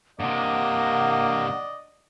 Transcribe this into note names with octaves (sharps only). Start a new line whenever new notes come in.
G2 C3 A#3 D4 D5 D#5 F#5